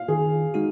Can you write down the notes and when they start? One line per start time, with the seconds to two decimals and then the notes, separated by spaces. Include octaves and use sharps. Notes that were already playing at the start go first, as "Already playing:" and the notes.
Already playing: F5
0.08 D#3 G#4
0.54 G#3 D#4 F#4